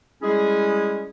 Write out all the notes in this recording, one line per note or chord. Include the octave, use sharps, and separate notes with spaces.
G3 G#3 C#4 E4 G#4